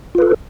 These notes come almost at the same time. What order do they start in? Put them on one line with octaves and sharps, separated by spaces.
F4 B4 A4